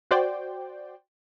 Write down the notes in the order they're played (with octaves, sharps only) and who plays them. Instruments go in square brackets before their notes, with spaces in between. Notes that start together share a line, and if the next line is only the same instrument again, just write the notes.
[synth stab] F#4 C5 D5 G5